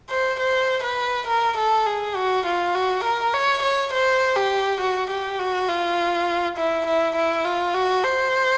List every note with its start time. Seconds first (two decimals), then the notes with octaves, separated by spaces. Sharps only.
0.10 C5
0.40 C5
0.83 B4
1.28 A#4
1.58 A4
1.86 G#4
2.16 F#4
2.46 F4
2.75 F#4
3.04 A#4
3.34 C#5
3.63 C#5
3.93 C5
4.36 G4
4.81 F#4
5.10 G4
5.40 F#4
5.69 F4
6.57 E4
6.87 E4
7.16 E4
7.45 F4
7.74 F#4
8.04 C5